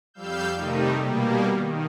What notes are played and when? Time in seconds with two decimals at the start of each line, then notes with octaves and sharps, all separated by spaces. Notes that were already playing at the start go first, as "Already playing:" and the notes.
0.14 F2 G3 F5 E6 G6
0.55 C3 D#3 G3 A3 D#4
0.99 B2 G3 A#3
1.51 D#3